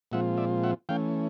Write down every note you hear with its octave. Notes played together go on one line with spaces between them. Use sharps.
A#2 F3 G#3 C4 F4 E5 F#5
D5 E5
E5 F#5
E3 A3 C#4 F5 G5